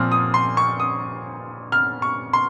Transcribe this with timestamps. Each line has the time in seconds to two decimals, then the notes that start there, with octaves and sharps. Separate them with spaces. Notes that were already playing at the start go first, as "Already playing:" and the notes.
Already playing: A#2 F3 C4 F6
0.12 D#6
0.34 C6
0.57 C#6
0.80 D#6
1.72 F6
2.02 C#6
2.33 C6